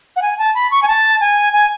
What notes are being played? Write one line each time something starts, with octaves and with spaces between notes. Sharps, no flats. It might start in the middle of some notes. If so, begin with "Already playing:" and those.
F#5
G#5
A5
B5
C#6
G#5
A5
G#5
G#5